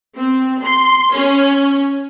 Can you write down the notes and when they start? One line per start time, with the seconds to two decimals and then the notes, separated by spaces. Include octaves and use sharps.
0.17 C4
0.62 C6
1.12 C#4